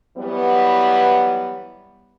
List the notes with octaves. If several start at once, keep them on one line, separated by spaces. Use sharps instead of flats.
E3 F#3 G3 B3